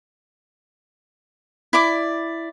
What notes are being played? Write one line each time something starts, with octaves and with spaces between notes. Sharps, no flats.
E4 D5 D6